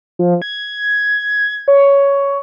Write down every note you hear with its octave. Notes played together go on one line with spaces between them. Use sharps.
F3
G#6
C#5